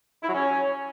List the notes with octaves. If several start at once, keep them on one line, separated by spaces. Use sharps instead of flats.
E4
F#3
C#4